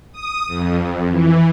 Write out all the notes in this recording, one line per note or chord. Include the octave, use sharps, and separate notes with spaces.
D#6
F2
E3